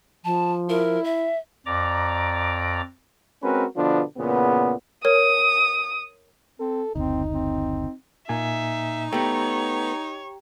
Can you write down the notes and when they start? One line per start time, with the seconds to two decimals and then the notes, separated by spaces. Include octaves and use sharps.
0.25 F3 A5
0.69 E4 A#4
1.04 E5
1.66 F2 D5 A#5 D6
3.43 G#3 C4 C#4 F#4 A#4 B4
3.77 B2 D3 F3 B3 D4 F4
4.18 E2 A#2 C#3 B3
5.05 A#4 C#5 D#6
6.60 C4 A4
6.95 F#1 D2 C4 D#4
7.34 C4
8.29 A#2 A#3 D#4 E5 G#5
9.13 A3 B3 G4 C#5 G5 A#5